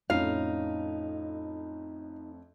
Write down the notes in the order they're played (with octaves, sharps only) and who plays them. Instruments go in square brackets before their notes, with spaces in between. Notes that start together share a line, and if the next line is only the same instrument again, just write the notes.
[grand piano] F2 A2 C#4 [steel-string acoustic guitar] D#4 [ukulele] F5